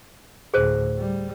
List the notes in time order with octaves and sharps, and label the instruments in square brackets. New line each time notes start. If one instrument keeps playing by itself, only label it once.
[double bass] D2 A2 [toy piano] G#4 C5
[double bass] G3